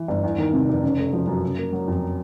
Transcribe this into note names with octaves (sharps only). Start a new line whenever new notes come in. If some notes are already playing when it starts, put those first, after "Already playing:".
Already playing: E3
G1
E2
D#3
C3
F1
C#3
A3
F3
F#2
C#3
A#3
F#3
F2